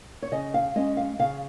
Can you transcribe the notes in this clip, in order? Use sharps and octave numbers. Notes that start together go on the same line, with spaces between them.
C#5
C#3 D#5
F5
G#3 C#4 D#5
F5
C#3 F5